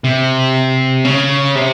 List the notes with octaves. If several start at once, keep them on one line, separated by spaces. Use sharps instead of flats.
C3
C#3
C3